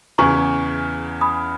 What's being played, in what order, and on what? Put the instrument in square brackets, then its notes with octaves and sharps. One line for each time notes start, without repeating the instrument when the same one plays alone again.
[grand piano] E2 C#3 E3 [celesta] A#5 C#6
[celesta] B5 D#6